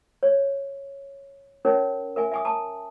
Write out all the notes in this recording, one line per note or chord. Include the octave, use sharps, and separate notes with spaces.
C#5
C#4 D#4 A#4 C#5
A#4 E5 G#5
E5 G#5 D#6
A5 A#5 D#6